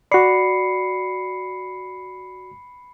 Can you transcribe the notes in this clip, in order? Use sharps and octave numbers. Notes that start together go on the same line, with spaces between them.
F#4 D5 B5 C7 C#7